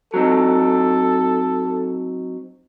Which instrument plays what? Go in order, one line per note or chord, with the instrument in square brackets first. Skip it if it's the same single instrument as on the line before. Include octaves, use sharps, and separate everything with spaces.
[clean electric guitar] F#3 C4 D#4 [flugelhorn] A4